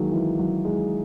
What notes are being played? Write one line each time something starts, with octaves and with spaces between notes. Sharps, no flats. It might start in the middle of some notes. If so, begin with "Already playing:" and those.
Already playing: D#3 F#3 G#3 A#3
E3
F#3
G#3